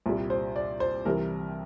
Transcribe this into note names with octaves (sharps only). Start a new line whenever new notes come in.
C2 A#2 G3
C5
D5
C5
C2 C3 E3 G3 A#4